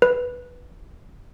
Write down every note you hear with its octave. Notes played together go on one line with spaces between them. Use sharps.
B4